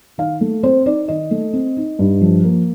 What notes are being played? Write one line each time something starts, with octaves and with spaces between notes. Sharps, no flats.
D#3 F5
A3
C4 C5
D#4 D5
D#3 D#5
A3
C4
D#4
G2
F3
A#3